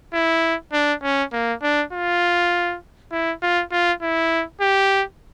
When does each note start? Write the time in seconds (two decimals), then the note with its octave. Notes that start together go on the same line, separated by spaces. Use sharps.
0.13 E4
0.72 D4
1.03 C#4
1.33 A#3
1.62 D4
1.93 F4
3.12 E4
3.42 F4
3.72 F4
4.02 E4
4.61 G4